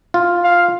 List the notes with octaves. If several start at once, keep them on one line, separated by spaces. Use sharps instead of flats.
F4
F5